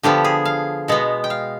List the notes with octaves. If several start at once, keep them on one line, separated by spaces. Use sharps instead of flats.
D3 F3 B3 G4
G#4
F5
B2 G#3 B3
G5
F5